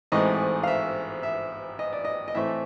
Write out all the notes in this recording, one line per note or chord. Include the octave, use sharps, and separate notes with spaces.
A1 G#2 E3 A3 C4 D#5
F5
E5
E5
D#5
D5
D#5
D#5
A2 E3 A3 C4 E5